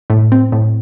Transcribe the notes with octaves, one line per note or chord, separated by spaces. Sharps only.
A2
C4
A2